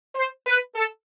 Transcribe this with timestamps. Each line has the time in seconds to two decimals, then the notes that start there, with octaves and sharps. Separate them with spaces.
0.15 C5
0.46 B4
0.75 A4